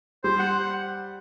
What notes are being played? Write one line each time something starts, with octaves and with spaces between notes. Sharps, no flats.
G3 C5
F#5